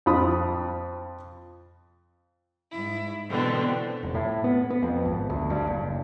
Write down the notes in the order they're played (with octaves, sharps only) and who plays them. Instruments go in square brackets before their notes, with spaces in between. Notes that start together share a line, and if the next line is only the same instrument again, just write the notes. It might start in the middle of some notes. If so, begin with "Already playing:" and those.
[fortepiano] F2 F4 B5 D#6
[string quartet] G#2 E4
B2 D3 E3 C4
[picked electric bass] F1
A2
B3
B3
F2
G#1
D2
G2
F#1